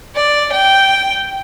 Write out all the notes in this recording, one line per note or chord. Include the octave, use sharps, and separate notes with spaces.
D5
G5